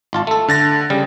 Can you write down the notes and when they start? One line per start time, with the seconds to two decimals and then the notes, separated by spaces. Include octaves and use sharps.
0.13 G#1 F4 A5
0.27 A3 A4
0.48 D3 A6 A#6
0.90 C#3 G3